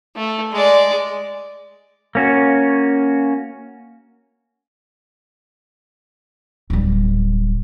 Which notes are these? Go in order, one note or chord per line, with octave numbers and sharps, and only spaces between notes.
A3
G#3 D5
A#3 C#4 F#4
D1 G3